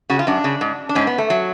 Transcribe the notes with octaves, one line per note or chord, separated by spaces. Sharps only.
C#3 F#4
F4
F#2 D4
C#3
G#2
D4
G#2 C#4
B3
A3
F#3